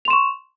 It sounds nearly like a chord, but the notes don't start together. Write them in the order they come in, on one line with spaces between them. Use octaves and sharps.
F7 C6 E7 C#6